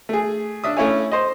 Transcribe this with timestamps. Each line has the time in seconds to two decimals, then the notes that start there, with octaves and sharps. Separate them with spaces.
0.09 A3 G#4
0.64 D4 E5 D#6
0.77 A3 C#4 E4 C#5 G#5
1.12 C5 D#5